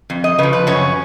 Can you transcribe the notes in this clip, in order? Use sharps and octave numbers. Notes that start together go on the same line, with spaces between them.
F2
D#5
C#3 F3 B4
B4
F#2 C#4